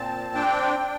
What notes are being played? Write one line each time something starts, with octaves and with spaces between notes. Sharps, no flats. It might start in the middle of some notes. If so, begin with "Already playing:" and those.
Already playing: A#2 C4 A5
D4 G5
D4